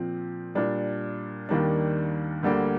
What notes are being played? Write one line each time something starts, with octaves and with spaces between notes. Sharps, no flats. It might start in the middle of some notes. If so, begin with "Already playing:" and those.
Already playing: A#2 F3 C4
A#2 G3 D4
D#2 D#3 G3 A#3 D4
D2 D3 G3 A#3